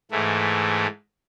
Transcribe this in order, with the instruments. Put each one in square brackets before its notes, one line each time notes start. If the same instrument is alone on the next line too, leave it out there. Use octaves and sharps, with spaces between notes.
[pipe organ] G#2 E3 A3